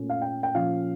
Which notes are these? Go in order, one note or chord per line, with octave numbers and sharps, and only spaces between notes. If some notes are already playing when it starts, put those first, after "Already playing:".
Already playing: A#2 A3 C#4
F5
G5
G5
A#2 F3 C#4 F5